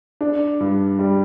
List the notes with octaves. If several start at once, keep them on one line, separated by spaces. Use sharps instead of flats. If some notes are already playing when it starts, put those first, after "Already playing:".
D4
G2
G3